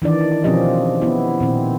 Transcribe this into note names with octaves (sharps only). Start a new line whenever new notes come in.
D#3 E3 D4 D5
B2 F3 C4 C#4 G4 D#5
B3 E4
A#2 D#3 C4